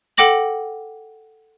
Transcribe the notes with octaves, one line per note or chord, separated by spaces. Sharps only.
A4 F#5 G5 D6 A#6 F#7